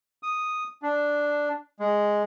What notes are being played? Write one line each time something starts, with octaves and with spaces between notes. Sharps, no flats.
D#6
D4
G#3